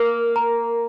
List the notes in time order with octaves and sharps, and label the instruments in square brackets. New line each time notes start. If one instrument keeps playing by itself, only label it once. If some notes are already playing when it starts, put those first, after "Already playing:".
Already playing: [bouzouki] A#3 [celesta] A#4
[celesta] A#5